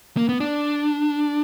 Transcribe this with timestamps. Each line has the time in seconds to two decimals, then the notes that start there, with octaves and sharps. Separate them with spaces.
0.17 A#3
0.29 B3
0.40 D4